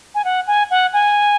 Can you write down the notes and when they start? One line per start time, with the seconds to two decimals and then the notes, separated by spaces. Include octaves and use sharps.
0.15 G#5
0.25 F#5
0.47 G#5
0.71 F#5
0.93 G#5